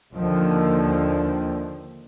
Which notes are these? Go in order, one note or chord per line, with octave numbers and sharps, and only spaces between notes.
D#2 D3 D#3 F3